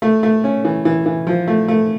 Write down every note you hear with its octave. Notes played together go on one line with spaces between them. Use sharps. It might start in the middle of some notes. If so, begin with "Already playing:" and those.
A3
A3
C#4
E3
E3
E3
F3
A3
A3